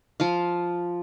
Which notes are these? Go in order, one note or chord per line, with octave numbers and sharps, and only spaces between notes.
F3 F4 F5